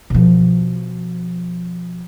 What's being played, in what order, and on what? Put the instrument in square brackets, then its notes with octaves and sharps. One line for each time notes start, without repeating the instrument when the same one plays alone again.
[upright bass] B2 F3